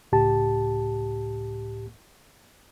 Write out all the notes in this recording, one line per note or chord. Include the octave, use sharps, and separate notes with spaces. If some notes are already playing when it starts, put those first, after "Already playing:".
C#2 A2 G4 A5